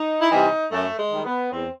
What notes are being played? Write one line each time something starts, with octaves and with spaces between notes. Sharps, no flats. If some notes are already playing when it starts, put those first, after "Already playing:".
Already playing: D#4
E4
C3 E3 G3 D#4
F#2 A3
G#3
D#3 G3
B3
E2 C4